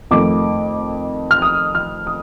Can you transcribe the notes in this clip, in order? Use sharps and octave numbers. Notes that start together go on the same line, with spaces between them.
F2 D#3 A3 D6
F6
D#6
F6
D#6